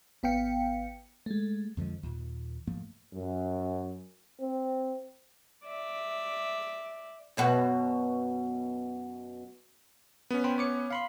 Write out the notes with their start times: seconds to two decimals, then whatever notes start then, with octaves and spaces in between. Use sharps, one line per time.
0.23 G#1 B3 F5 G5 C#7
1.26 G#3 A3
1.77 F2 D3 F3 G#3
2.03 D#2 A#2
2.67 G#2 F3 A3 A#3
3.13 F#2
4.40 C4
5.66 D5 E5
7.37 F#2 B2 F#4
10.30 B3 C#4
10.44 C5 G5 B5
10.58 C#5 D6 C#7
10.91 F5 B5 C6